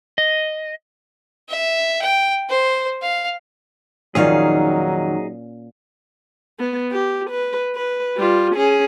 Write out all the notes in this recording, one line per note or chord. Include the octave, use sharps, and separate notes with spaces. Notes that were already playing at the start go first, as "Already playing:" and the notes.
D#5
E5
G5
C5
F5
F2 A#2 D#3 F#3 C#4 D#4 G#4 F5
B3
G4
B4
B4
G3 F4
C#4 G#4